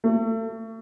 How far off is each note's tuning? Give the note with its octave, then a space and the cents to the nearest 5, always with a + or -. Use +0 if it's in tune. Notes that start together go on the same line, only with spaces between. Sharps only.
A3 +35